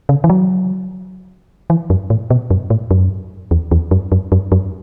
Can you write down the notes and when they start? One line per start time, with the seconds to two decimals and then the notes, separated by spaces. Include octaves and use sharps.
0.09 C#3
0.24 E3
0.30 F#3
1.70 E3
1.90 F#2
2.10 A2
2.30 B2
2.51 F#2
2.70 A2
2.91 F#2
3.51 E2
3.71 E2
3.91 F#2
4.12 F#2
4.32 F#2
4.52 F#2